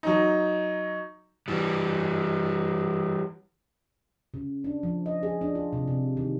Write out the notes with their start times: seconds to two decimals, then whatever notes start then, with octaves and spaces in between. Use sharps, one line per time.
0.03 F#3 D#4
1.48 E3 G3
4.34 C#3
4.64 D4
4.83 F3
5.06 D#5
5.23 G#4
5.41 D4
5.55 F4
5.73 C3
5.88 C3
6.17 D#3